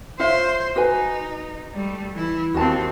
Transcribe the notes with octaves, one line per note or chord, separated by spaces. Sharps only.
F4 C5 C#5 E5
D#4 F#4 B4 G#5
G3 A3
E3 E4
D#2 C4 F#4 A5